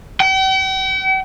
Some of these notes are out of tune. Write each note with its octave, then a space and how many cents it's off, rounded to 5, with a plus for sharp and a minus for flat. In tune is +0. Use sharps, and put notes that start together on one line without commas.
G5 -45